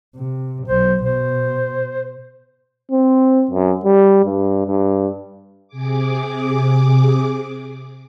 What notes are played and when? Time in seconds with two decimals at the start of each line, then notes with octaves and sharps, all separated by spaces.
0.16 C3
0.68 B1 C5
1.03 B2 C5
2.92 C4
3.51 F#2
3.85 G3
4.25 G2
4.67 G2
5.68 C3 G#4 D6